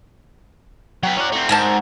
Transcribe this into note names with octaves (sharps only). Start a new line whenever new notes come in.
F#3 F#4 B4 G5 A#5
C#4 E4 D5 F#5
A3 C4
G#2 C4 A#4 F#5 G#5 A5